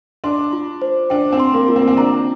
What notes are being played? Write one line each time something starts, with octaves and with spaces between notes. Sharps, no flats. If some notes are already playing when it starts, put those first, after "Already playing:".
D4 C6
F4
C5
D4 G5
C4
C6
A#3
F4
C4
C4
D4 A#5